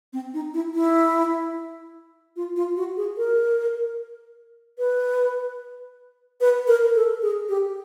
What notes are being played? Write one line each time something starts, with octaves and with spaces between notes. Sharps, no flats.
C4
D#4
E4
E4
F4
F4
F#4
G#4
A#4
B4
B4
A#4
A4
G#4
G4